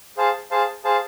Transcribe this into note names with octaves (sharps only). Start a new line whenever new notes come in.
G#4 C5 F5 A5
G#4 C5 F5 A5
G#4 C5 F5 A5